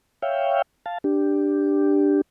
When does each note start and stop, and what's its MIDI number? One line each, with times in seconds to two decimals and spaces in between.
0.22 0.62 73
0.22 0.62 76
0.22 0.62 77
0.22 0.62 79
0.86 0.98 77
0.86 0.98 81
1.04 2.21 62
1.04 2.21 67